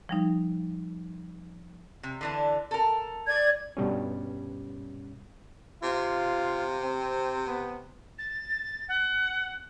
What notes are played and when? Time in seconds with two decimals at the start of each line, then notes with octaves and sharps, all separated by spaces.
0.09 F3 G3 D#4
2.03 C3
2.21 D3 E3 D4
2.71 A4 A#4
3.27 D5 G#6
3.77 G2 B2 G3 C#4
5.83 C3 F4
6.83 C4
7.47 B3
8.18 A6
8.88 F#5